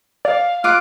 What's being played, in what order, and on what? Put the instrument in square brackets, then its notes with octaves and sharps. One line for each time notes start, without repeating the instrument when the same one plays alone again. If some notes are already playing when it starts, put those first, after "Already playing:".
[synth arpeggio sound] D5 [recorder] F5
[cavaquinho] F4 D6 [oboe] F5 [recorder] F#6